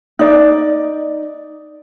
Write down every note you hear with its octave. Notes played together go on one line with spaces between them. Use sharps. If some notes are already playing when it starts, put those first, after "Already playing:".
D#4 D5